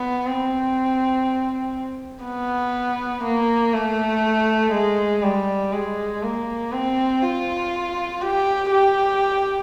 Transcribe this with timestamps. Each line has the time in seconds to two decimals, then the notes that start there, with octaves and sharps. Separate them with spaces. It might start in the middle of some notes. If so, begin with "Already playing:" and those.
Already playing: B3
0.26 C4
2.24 B3
3.24 A#3
3.74 A3
4.73 G#3
5.23 G3
5.72 G#3
6.23 A#3
6.72 C4
7.22 F4
8.21 G4
8.71 G4